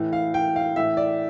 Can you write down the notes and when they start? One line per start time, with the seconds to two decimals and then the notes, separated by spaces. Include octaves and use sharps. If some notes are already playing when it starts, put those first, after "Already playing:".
Already playing: A2 E3
0.13 F5
0.34 G5
0.56 F5
0.76 A2 E3 E5
0.97 D5